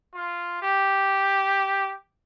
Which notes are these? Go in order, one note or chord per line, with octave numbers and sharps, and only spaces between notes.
F4
G4